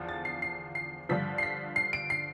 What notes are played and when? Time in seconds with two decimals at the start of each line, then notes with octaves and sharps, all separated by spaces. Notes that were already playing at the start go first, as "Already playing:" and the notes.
Already playing: E2 D3 F3
0.09 A6
0.25 C7
0.42 C7
0.75 C7
1.09 G2 D3 F3 B6
1.38 C7
1.43 B6
1.76 C7
1.93 D7
2.10 C7